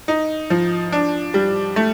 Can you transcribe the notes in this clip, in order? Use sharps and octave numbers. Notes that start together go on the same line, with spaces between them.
D#4
F3
D4
G3
A3